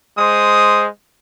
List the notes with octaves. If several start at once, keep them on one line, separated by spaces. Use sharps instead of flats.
G#3 C5 D#6